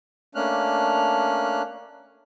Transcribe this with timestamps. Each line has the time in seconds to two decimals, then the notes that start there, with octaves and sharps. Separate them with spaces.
0.35 A3 A#3 C#4 D4 F6 F#6